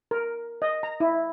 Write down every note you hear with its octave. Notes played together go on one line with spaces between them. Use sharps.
A#4
D#5
A#5
E4